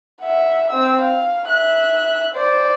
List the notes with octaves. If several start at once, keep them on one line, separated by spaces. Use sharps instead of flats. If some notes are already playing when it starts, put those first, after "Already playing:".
E5 F#5
C4 E6
F5
E5 F#6
C5 D5